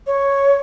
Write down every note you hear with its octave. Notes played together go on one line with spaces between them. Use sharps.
C#5